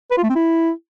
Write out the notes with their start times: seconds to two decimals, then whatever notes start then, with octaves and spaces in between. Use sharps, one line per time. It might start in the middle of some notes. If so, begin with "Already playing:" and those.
0.11 B4
0.17 F4
0.23 A3
0.29 C4
0.35 E4